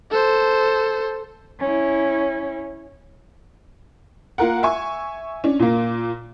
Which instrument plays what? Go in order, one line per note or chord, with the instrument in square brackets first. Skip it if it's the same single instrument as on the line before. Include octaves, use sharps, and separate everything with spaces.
[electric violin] A4 C5
[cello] C#4 E4
[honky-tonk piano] A#3 F4 A#4 F#5
E5 G#5 C#6
C#4 D4
A#2 A#3